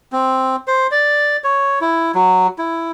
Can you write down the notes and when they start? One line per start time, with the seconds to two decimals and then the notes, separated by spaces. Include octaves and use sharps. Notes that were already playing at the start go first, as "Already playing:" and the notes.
0.12 C4
0.68 C5
0.91 D5
1.44 C#5
1.81 E4
2.15 F#3
2.58 E4